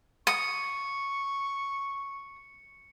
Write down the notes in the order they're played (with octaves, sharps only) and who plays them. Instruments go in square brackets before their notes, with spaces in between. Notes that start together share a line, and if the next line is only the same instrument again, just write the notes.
[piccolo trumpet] C#6 [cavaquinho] D#6 [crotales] C#7